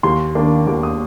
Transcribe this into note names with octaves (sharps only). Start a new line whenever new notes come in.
D#2 C6
D#3 A#3 D4
D#2 D6
D#6